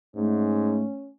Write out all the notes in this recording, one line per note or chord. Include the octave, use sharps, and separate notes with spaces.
G#2 A3 C#4